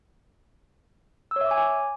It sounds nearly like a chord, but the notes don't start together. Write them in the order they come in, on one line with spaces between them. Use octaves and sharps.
E6 C#5 E5 D6 G#5